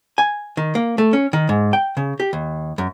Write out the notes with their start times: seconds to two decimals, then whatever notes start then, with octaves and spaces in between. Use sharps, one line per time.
0.18 G#5
0.57 D#3
0.75 A#3
0.98 A3
1.13 C#4
1.33 D#3
1.49 G#2
1.73 G5
1.97 C#3
2.20 G4
2.33 D#2
2.78 F#2